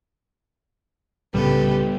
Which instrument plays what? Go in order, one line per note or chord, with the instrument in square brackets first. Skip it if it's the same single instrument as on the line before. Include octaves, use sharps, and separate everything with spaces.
[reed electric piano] C2 A2 C#3 [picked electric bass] G3 B3 [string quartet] G4 A4 B4